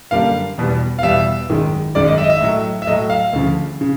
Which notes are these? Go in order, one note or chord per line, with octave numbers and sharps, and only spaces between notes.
F#2 D3 G3 A#3 D4 F5
E2 B2 G3 B3
F5
E2 B2 G3 B3 E5
G#1 F#2 D#3 G#3
G#1 F#2 D#3 G#3 D5
D#5
E5
D#5
E5
A2 F#3 A3
E5
A2 F#3 A3 D#5
F5
D2 C#3 F3
C#3